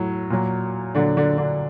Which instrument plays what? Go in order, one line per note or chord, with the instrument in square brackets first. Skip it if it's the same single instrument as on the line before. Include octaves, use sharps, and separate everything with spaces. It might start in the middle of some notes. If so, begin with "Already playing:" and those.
Already playing: [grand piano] A2 F#3
A#2 F#3
A#2 D3 D4
F#3
D3 D4
D3 D4